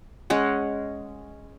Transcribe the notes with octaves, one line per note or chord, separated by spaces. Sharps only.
G#3 C#4 F#5